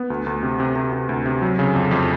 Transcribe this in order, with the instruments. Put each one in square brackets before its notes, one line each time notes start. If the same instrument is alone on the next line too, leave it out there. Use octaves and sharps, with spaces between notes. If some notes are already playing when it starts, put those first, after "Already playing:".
Already playing: [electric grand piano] B3
D2
D2
C3
C3
C3
C3
D2
C3
F#3
C#3
F2
F2